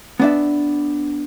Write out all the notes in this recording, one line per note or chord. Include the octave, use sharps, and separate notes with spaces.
B3 D4 E5